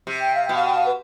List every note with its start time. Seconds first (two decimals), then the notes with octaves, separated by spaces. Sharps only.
0.07 C3
0.20 G5
0.35 F5
0.45 B2 G5
0.55 F5
0.65 G5
0.75 F5
0.86 B4